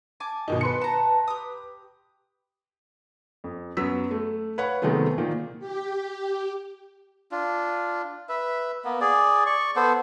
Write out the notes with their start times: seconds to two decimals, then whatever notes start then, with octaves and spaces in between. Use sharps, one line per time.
0.20 G#5 A5 D6
0.48 B2 D#3 D#4
0.61 B4 C6 C#7
0.81 A5 A#5
1.28 G4 D#6
3.44 F2
3.77 F#2 F#3 B3 E6 B6
4.11 A3
4.58 B4 C#5 F5 F#5 B5
4.82 C3 D#3 F#3 G#3 A3 B3
5.18 A#2 D#3 F3 A#3
5.59 G4
7.31 D4 F4
8.29 B4 E5
8.85 A#3 B3
9.01 G#4 D5
9.46 D5 C#6
9.76 B3 A4 C5